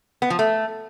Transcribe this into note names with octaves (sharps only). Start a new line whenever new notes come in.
B3
F3
A3